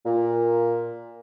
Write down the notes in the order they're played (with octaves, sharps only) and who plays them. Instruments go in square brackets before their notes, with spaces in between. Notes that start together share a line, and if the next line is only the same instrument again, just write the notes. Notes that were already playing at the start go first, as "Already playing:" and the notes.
[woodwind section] A#2